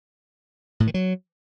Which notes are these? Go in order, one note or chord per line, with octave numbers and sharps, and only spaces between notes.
A2
D#3
F#3